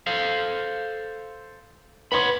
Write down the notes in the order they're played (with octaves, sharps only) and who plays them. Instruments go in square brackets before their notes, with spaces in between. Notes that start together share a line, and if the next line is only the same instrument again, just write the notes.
[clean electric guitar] A4 C5 F5
[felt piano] B4 C6 [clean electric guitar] C#5 F#5 B5